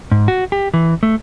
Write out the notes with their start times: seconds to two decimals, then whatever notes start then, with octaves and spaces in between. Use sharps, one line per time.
0.11 G#2
0.28 F#4
0.52 G4
0.74 E3
1.03 A3